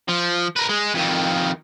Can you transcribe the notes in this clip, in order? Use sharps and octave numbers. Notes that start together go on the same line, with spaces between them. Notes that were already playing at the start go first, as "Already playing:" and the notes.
F3
A#4 B4
G#3
F2 D#3